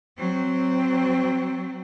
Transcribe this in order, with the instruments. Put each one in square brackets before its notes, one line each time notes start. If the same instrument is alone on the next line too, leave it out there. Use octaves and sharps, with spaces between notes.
[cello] F#3 C4